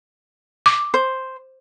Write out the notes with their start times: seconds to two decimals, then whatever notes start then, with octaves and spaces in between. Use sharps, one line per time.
0.66 D6
0.94 C5